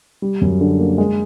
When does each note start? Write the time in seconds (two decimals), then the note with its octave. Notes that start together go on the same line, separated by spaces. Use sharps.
0.22 G3
0.41 F#2
0.61 D3
0.80 A#3
0.98 G#3